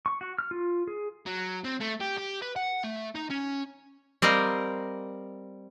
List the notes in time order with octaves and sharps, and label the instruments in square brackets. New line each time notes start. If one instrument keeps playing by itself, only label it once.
[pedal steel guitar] C#6
F#4
F6
F4
G#4
[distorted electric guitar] F#3
C4
A3
G4
G4
B4
F#5
A3
D#4
C#4
[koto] G3 C4 A#4 D#5 F5